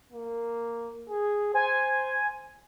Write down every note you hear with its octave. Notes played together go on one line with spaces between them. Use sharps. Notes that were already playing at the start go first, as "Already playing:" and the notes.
A#3
G#4
C5 G#5